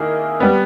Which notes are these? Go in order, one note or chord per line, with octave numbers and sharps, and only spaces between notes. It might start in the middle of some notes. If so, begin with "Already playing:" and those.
Already playing: D#3 A#3 E4 G#4
G3 B3